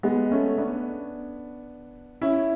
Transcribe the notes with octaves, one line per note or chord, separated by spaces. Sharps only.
G#3 B3
A3 C#4
B3 D4
C#4 E4